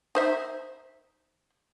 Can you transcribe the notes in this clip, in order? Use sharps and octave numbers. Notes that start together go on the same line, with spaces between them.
D#4 C5 E5